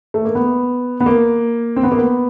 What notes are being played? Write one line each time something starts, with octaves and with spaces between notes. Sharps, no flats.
A3
A#3
B3
B3
A#3
C4
B3
A#3
B3